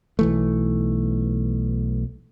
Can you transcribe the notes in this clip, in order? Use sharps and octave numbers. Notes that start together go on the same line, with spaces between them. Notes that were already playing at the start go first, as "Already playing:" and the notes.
B1 E3 A3